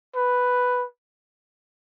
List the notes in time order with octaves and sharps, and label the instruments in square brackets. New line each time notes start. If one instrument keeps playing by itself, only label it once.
[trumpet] B4